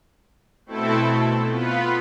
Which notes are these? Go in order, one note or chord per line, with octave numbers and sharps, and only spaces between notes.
B2 A3 C4 E4 A4
B3 F4 B4